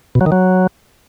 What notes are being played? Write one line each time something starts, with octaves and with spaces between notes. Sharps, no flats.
B2
F#3
D#3
F#3